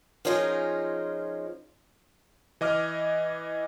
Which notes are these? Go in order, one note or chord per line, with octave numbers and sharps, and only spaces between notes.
F3 C#4 D#4 F4 G#4 A#4
E3 D#5 D6 F6